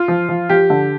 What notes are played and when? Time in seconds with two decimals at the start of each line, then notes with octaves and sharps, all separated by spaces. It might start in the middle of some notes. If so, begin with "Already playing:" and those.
Already playing: F4
0.08 F3
0.29 F3
0.49 F3 G4
0.70 D3